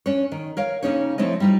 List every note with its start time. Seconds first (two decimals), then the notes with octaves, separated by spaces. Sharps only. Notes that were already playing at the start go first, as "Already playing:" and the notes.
0.06 C#4 D4 C#5
0.32 D#3
0.57 A#4 C#5 F5
0.83 C#3 A#3 C#4 D#4 G#4 C#5
1.18 F3 A3 C4 E4 C#5 D#5
1.40 G3 D#4 F4